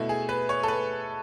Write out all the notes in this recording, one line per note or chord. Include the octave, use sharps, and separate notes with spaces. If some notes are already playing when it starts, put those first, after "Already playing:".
Already playing: B2 A3 E4
G#4
B4
C#5
A4
B4